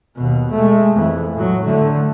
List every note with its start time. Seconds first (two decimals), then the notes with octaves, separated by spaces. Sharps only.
0.16 D#2 B2
0.51 G#3 A3
0.94 F2 E3
1.34 A2 F#3
1.65 D3 A3